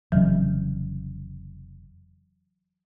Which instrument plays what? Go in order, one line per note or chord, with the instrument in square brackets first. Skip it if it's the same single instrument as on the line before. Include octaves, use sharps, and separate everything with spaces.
[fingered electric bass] F1 C#3 [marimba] E3 F#3